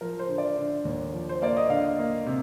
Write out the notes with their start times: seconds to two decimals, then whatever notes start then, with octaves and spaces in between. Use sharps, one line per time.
0.01 F3 A#4
0.19 C5
0.28 D3
0.38 D5
0.57 D3
0.85 D#2
1.13 F3
1.29 C5
1.42 A#3 D5
1.57 D#5
1.70 D3 F5
1.99 A#3
2.26 C3